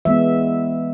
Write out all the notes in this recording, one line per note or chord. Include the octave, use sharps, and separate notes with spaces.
E3 G#3 B3 E5